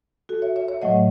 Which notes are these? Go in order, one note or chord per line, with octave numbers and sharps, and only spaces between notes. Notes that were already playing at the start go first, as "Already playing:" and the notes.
F#4 A4
C#5 E5
C#5 E5
C#5 E5
A2 F#3 A3 D#5 F#5